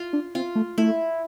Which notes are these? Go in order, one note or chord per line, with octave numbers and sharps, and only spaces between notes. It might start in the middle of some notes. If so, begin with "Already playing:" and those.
Already playing: F4
D4
C4 F4
A3
A3 E4